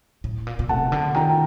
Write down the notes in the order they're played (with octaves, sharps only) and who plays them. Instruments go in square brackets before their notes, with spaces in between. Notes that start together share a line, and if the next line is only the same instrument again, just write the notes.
[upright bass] A2
A#2
A#2
[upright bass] C3 [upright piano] F#5 A5
[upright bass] D3
[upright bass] D#3 [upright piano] G5 A#5